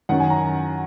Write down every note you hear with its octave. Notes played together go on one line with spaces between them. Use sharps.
F#2 D#3 F#3 C#4 F#5
G#5
A#5